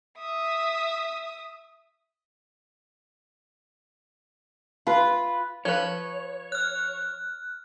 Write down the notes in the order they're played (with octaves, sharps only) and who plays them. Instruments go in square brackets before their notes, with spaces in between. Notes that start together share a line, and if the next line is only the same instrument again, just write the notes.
[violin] E5 D#6
[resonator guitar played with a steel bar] F4 [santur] B4 B5
[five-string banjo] F3 B4 [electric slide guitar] C#5 [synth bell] G#6
[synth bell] F6 F#6